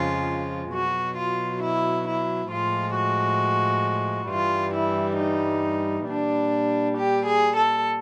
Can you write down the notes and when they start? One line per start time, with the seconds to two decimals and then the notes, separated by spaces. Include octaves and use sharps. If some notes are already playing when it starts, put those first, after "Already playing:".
Already playing: F2 C#3 F3 G#3 F4
0.73 B2 F#3 F#4
1.18 F4
1.63 E4
2.07 E4
2.51 A2 F3 G#3 F4
2.97 F#4
4.30 G2 E3 G3 F4
4.74 E4
5.19 D#4
6.08 A#2 G3 D4
6.97 G4
7.27 G#4
7.56 A4